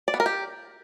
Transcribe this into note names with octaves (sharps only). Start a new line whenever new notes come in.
D5
B3
A#4
G4